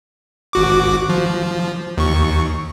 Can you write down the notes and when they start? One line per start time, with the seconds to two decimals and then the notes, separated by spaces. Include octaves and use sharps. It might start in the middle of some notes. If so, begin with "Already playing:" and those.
0.53 G#1 F#4 D6
1.09 F3
1.98 D#2 C#6